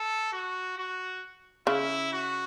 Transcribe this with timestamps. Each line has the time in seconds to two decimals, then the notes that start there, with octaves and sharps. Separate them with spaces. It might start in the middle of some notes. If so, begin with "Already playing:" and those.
Already playing: A4
0.32 F#4
0.77 F#4
1.67 C#3 E4
2.12 F#4